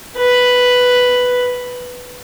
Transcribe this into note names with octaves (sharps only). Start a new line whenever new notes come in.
B4